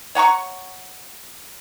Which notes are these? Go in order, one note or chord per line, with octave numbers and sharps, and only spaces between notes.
C#5 F#5 A#5 C#6